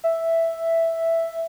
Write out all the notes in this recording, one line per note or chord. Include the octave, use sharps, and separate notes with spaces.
E5